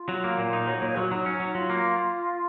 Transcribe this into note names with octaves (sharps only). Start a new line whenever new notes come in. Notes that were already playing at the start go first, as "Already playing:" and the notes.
Already playing: F4
F#3
A#3
A#2
D#4
F#3 C#5
C#5
A#2
C#5
F#3 F4 F#4
F#3 D#4
C#4
F#3 D#4
F#3 F4
A#3